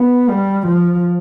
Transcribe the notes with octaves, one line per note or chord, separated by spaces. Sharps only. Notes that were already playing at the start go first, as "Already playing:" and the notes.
Already playing: B3
G3
F3